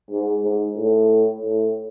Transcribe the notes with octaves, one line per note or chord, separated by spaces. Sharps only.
G#2
G#2
A2
A2